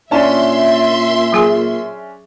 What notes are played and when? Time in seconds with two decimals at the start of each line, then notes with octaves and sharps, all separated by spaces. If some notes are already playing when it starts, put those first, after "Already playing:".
0.11 A#2 C#4 D4 E5 A5 C6
1.33 F#3 G#4 G#5